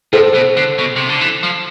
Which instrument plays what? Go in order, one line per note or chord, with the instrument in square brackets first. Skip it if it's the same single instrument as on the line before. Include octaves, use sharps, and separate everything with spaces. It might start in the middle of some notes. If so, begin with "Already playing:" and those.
[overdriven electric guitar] A2 [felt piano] A4 C5
[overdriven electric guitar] B2
D3
B2
C3
D3
E3
F3